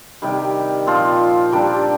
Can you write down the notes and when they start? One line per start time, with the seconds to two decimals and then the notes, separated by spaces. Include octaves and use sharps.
0.22 C3 D#3 G3
0.87 A#2 F3 C4 F4
1.52 G3 D4 G4 A#4